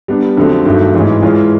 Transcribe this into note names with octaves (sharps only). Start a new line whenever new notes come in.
G3 B3 D4
F2 D3 F#3 A3 C4
G2 D#3 F#3 A3
G#2 E3 G#3 C#4
E3 G#3 C#4 F4